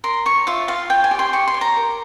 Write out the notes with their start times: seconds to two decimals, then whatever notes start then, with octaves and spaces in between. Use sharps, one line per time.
0.04 A#4 C6
0.26 C#5 C#6
0.47 F4 E5
0.68 F4 F5
0.90 C#5 G5
1.04 G#5
1.11 G4
1.19 C6
1.33 G4 C#6
1.48 C6
1.54 C#5
1.61 A#5
1.76 A#4